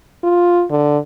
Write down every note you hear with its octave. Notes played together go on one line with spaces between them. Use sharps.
F4
D3